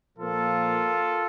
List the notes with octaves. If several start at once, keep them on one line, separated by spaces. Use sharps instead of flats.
A#2 F3 A#3 F4 A4